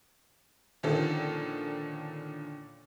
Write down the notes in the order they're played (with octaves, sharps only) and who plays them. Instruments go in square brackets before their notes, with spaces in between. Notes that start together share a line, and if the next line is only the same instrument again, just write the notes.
[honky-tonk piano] A#2 D3 D#3 F3 C#4 A4